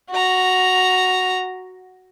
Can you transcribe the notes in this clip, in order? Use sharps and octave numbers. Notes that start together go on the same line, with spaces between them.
F#4 A#5